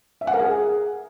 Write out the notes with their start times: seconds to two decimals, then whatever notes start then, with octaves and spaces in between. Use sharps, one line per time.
0.21 E5
0.27 F#5
0.33 A#4
0.40 G#4